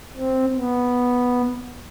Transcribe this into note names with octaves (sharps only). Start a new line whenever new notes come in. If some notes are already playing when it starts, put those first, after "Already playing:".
C4
B3